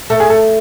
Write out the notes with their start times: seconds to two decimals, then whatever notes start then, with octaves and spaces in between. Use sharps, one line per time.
0.10 A3 A4
0.20 G#4
0.30 A4